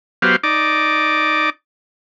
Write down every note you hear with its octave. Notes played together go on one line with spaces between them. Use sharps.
F#3 B3 G4 C5 F5
D#4 D5 D6